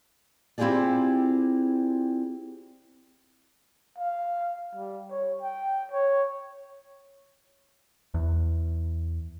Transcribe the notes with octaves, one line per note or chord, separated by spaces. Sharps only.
C4 E4 F4 G4 G#4 D5
F5
G3
C#5
G5
C#5
E2